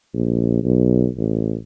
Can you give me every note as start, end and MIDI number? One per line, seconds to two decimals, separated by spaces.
0.14 0.63 34
0.64 1.08 35
1.17 1.56 33